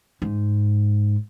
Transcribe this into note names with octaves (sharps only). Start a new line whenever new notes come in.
G#2